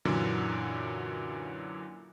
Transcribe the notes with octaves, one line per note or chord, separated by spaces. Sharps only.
F#2 A#2 D3 E3 F#3